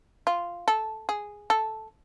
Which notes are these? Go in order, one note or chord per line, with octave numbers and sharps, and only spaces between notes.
F4
A4
G#4
A4